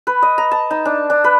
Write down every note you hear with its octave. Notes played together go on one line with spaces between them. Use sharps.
B4
D#5
A#5
A5
D#4
D4
D4
B4